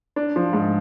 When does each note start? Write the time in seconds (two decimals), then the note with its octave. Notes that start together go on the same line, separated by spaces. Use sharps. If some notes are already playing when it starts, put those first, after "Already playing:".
0.16 D4
0.36 F3
0.53 G#2